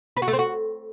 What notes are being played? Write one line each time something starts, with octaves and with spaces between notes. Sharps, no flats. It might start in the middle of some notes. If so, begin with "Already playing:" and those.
B4
F#4
A3
C4
F#4